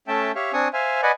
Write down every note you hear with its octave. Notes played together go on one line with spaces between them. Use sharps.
A3 C#4 E5 G5 A5
G4 C#5 E5 F5
C4 D4 G#5 C#6 D#6
C5 E5 F5 G#5
B4 D5 D#5 F#5 G#5